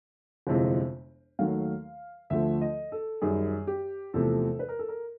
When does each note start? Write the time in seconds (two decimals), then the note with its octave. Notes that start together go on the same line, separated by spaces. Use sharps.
0.47 G1 F2 C3 E3 G#3
1.39 D#2 D#3 F#3 A3 F5
2.30 D2 D3 F3 A3 E5
2.61 D#5
2.92 A4
3.22 F#2 D#3 G3 G#4
3.67 G4
4.14 E2 C3 F3 A3 A4
4.59 B4
4.69 A#4
4.79 A4
4.88 A#4